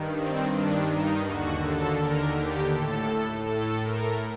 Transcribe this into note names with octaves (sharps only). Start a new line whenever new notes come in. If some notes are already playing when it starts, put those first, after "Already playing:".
Already playing: G2 D#3
C4
G2 D#3 D4
D#4
D#2 D3 F#4
A4
D#2 D3 A#4
G4
A2 A4
A2 A4
A#4